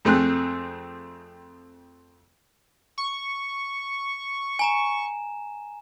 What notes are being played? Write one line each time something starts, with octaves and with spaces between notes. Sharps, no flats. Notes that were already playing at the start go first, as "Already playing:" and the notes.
F2 A3 C4 G#4 F#6
C#6
G#5 A#5 E7